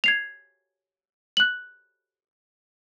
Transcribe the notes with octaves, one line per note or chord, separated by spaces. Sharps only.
G#6 C7 F7
F#6 F#7